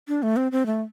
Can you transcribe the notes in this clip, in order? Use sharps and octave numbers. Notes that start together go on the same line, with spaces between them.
D4
A3
C4
C4
A3